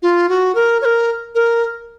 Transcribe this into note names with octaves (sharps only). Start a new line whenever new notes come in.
F4
F#4
A#4
C#5
A#4
A#4